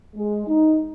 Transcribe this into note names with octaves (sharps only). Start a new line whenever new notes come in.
G#3
D#4